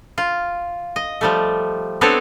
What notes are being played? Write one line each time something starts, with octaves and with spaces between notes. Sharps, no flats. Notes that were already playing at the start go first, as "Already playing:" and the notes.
F4
D#5
F3 G3 A3
B3 C4 D4 A4 B4 C#5